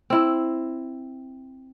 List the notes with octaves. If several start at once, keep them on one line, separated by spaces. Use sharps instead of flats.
C4 E4